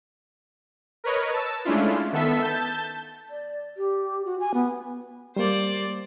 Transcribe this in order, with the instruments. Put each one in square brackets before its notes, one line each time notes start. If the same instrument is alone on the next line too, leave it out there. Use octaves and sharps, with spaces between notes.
[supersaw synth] A#4 B4 C#5 D#5
A5 E6
G#3 A3 C#4 D4 E4 F4
D#3 B3 A4 E5 B6
A5 G6
[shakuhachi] D5
G4
F#4
G#5
B3
[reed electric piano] G3 A#3 [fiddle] C5 D5